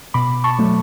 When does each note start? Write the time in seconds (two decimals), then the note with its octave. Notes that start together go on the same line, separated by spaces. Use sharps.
0.14 B2 B5 D6
0.44 A5 C#6
0.59 F#3 A3